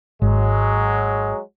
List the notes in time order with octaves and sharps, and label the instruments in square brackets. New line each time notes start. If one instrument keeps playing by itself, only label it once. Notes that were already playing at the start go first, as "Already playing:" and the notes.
[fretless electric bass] G#1 [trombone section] F#3 G#3